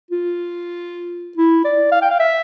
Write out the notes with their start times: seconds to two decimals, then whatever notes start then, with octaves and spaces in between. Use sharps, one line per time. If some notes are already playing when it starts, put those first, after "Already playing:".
0.11 F4
1.37 E4
1.65 D5
1.92 F5
2.02 G5
2.11 F5
2.20 E5